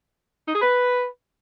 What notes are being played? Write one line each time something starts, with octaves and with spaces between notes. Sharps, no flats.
D#4
G#4
B4